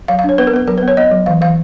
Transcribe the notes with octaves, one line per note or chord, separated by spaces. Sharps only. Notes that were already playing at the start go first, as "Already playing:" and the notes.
F#3 F5
F5
D4 C#5
B3 B4
A#4
B3 B4
F#3 A#4
B4
B3
C#5
B3 D#5
F#3
E3 F5
E3 F5